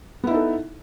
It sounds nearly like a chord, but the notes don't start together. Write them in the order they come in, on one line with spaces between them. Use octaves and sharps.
B3 E4 D#4 A4